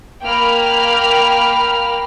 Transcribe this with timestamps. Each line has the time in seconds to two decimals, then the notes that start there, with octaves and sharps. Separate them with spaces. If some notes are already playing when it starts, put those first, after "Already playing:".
0.24 A#3 G5 B5 F6